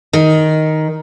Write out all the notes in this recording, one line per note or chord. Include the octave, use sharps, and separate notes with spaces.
D#3